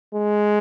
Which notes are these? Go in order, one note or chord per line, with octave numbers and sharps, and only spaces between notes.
G#3